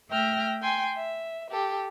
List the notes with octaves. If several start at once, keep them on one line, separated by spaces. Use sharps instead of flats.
A3 E5 G5 F6 A#6
G5 G#5 C6
E5
G4 A4